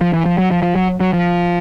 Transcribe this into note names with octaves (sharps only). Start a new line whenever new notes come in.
F3
E3
F3
F#3
F3
F3
F#3
F#3
F3